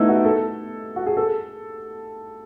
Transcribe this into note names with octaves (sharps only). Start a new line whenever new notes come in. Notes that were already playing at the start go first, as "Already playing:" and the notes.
Already playing: A3 B3 D#4 E4
F#4
A4
F#4
G#4
A4